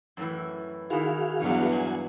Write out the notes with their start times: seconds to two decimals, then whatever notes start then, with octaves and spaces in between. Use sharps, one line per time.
0.17 F#2 A2 E3
0.90 D#3 E4 F#4 G#4 F5
1.40 E2 G2 F#3
1.72 A#2 F#5 G#5